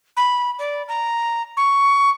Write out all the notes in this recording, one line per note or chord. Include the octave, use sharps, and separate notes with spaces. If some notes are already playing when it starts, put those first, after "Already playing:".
B5
D5
A#5
C#6